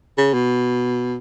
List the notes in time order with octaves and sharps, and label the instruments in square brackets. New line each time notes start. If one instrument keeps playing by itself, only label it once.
[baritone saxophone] C#3
B2